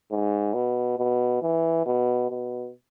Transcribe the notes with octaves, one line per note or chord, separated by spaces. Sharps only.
G#2
B2
B2
E3
B2
B2